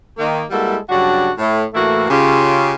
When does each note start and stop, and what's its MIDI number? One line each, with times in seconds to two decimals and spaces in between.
0.18 0.43 51
0.18 0.43 58
0.50 0.76 55
0.50 0.76 56
0.50 0.76 58
0.50 0.76 64
0.50 0.76 66
0.50 0.76 69
0.89 1.29 43
0.89 1.29 49
0.89 1.29 54
0.89 1.29 62
0.89 1.29 66
1.38 1.64 45
1.73 2.05 45
1.73 2.05 52
1.73 2.05 57
1.73 2.05 58
1.73 2.05 64
1.73 2.05 66
2.10 2.73 49
2.10 2.73 65
2.10 2.73 67